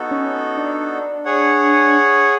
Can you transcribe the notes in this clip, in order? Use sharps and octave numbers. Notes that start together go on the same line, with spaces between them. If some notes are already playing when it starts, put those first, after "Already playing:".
Already playing: B3 D#4 F#4 A4
C#4
D4
G#4 C#5 F#5